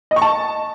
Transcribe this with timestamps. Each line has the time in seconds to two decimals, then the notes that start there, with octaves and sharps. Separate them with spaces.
0.11 D#5
0.16 C#6
0.22 A5